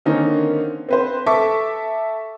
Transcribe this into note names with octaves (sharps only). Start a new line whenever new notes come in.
D3 D#3 A#3 C4 C#4 D#4
C4 B4 C5
A4 E5 C#6 D6